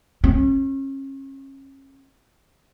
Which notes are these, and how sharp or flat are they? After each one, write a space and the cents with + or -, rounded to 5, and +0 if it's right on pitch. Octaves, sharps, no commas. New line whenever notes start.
C#4 -35